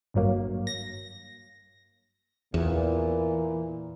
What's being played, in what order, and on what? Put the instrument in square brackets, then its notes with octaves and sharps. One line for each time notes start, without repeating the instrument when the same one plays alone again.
[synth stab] G#1 G2 F#3 A#3
A#6
[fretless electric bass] E2 [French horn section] A#2 E3